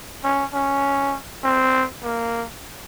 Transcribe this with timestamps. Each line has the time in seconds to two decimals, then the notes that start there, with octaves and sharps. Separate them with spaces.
0.24 C#4
0.54 C#4
1.44 C4
2.03 A#3